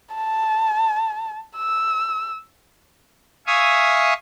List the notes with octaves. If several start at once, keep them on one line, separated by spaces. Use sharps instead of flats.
A5
E6
E5 F5 G#5 C#6 D#6